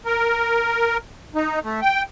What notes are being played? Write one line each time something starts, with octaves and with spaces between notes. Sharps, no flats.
A#4
D#4
A3
G5